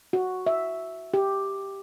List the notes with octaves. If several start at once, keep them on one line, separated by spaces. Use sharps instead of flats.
F#4
E5
G4